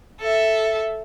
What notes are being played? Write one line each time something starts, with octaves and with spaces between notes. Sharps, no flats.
A4 E5